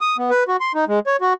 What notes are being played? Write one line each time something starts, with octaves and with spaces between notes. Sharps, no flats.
D#6
B3
B4
F#4
C6
D#4
G#3
C#5
F#4